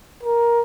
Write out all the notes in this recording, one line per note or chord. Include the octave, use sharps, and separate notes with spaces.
A#4